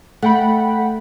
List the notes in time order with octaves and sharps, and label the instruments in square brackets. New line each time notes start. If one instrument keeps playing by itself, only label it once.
[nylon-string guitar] A3 [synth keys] F#5 G5 B5